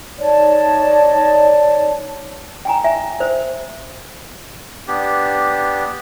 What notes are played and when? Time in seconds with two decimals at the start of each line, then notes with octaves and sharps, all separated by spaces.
0.19 D#4 C#5 D5 A5
2.65 G5 G#5 A#5
2.84 E5 G#5
3.20 C5
4.88 B3 D4 G4